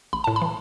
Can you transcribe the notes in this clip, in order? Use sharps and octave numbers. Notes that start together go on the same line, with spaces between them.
A1 B5
A2 A5
B5
E3